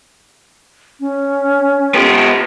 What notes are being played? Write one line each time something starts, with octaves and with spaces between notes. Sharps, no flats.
C#4
B3 G4